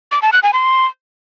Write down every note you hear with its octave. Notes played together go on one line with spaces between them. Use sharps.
D6
A5
F#6
G#5
C6